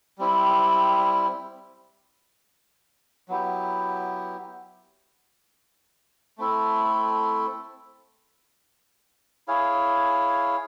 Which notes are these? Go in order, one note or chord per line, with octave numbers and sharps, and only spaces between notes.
G3 C4 E4
F#3 B3 E4 G4
A3 C4 E4 A4
E4 G#4 C#5 F5